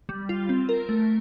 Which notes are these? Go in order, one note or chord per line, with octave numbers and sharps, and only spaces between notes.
G3
F4
C4
A#4
A3